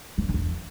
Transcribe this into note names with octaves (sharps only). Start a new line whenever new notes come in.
F3
G2
D3
E2